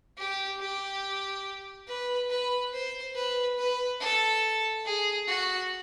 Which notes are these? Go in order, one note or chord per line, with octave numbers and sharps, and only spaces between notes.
G4
G4
B4
B4
C5
B4
B4
A4
G#4
F#4